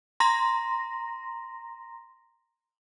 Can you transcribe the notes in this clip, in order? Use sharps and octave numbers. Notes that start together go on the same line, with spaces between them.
A#5 C6 A#6